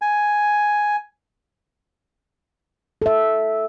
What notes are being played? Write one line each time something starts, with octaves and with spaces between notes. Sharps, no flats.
G#5
A4 E5